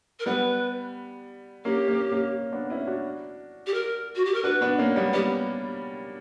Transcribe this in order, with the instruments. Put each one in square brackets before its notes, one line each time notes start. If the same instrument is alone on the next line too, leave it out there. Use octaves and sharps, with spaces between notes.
[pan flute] A#4
[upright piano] G3 B3 [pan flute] B4
[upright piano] A#3 C#4 [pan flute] G4
[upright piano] A#3 C#4
A#3 C#4
B3 D4
C#4 E4
D4 F#4
[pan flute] G4
A#4
F#4
G4
A#4
[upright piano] D4 F#4 [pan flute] B4
[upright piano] B3 D4
A#3 C#4
G3 B3
[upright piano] G3 B3 [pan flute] G4